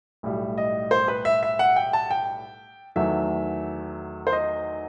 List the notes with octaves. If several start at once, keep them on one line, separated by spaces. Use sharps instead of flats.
B1 A2 G3
D#5
C5
B4
E5
E5
F#5
G5
A5
G5
E2 D#3 F#3 A3 E5
C5
D#5